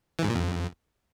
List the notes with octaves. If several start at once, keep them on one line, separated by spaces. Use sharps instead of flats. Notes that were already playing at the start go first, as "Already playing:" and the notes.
E3
G#2
A#2
F2